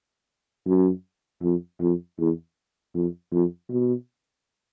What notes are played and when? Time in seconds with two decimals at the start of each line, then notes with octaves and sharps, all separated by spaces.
0.67 F#2
1.43 F2
1.81 F2
2.19 E2
2.95 F2
3.33 F2
3.71 B2